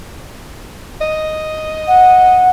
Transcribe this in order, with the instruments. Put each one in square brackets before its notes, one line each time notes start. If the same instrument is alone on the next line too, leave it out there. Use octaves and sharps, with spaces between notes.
[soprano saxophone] D#5
[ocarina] F#5